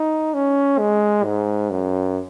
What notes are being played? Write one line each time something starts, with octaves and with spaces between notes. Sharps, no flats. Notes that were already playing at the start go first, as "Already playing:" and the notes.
Already playing: D#4
C#4
G#3
G#2
F#2